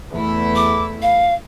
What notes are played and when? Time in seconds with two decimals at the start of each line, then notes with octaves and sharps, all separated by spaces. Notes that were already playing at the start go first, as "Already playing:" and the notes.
0.11 E2 A3 E4
0.56 D6
1.02 F5